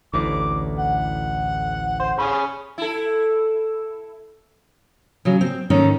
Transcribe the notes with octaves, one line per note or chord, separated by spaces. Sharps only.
A1 D2 A2 D6
F#5
C5
C#4 G#4 B5
E4 A4
C#3 F#3
C4
G#2 D#3 A3 C#4 D#4